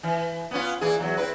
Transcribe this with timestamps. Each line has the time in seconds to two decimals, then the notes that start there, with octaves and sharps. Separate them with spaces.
0.03 E3
0.51 B3 C#4 F4
0.81 A#2 E3 G#4
1.00 E2 F#3
1.17 C4 E4 B4